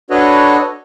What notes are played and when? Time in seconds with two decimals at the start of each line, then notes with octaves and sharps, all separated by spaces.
0.10 D4 F#4 A4 B4 C#5 D#5